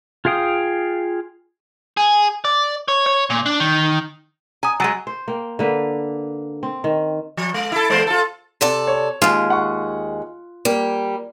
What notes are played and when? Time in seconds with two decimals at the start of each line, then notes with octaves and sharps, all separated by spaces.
0.25 F4 G#4 F5 G5 D#6
1.97 G#4
2.45 D5
2.88 C#5
3.06 C#5
3.30 A#2
3.46 D4
3.60 D#3
4.63 G#5 A#5 D#6
4.80 F#3 G#3 G#5 A6 D#7
5.07 C5
5.28 A#3 G5
5.59 D3 A#3 B4
6.63 C4
6.84 D#3
7.37 F3
7.54 G#3
7.72 E4 A4
7.90 E2 G#3 C5
8.07 F4 A4
8.61 C3 A4 D5
8.87 C#5
9.22 D#2 G#3 F4
9.50 F#5 C#6
10.65 G3 A#3